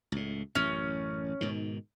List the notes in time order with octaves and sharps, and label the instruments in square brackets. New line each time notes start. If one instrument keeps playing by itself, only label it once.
[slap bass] C#2 A2
[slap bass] A1 F#2 [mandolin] C#4
[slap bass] G#2 B2 D#3